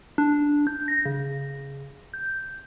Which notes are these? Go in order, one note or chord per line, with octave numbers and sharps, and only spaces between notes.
D4
G6
A#6
C#3
G6